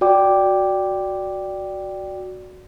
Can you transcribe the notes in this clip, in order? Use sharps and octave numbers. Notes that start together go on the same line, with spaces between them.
F#4 D5 G5 D6